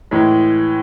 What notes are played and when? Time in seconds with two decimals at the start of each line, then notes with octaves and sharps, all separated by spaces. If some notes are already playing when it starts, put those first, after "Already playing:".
0.11 A2 E3 G#3